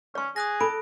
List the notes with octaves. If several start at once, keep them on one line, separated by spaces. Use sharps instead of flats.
C#4 D5 C#6
G#4 D#6 F#6 A#6
A4 B5 D7